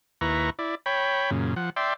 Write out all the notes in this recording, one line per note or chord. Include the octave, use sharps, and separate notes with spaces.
D#2 E4 B4 A#5 C#6
E4 D5
C#5 G5 B5
F#2 A#2 C#3
F3 F#5
D5 E5 G5 C6